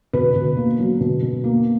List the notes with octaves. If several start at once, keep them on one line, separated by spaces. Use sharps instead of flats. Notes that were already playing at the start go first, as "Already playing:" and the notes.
B2 B4
B2
A#3
F#3
B2
B2
A#3